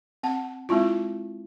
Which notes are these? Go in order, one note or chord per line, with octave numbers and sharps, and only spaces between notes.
C4 F#5 A5
G#3 C4 E4 F4